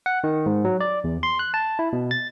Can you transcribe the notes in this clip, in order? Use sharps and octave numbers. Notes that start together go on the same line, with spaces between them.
F#5
D#3
G#2
F#3
D5
E2
C6
F#6
A5
E4
B2
A6